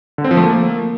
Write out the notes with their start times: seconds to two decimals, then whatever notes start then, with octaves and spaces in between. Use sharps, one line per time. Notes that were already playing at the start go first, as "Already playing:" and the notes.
0.18 D3
0.24 C4
0.31 F3
0.37 A3
0.43 A#3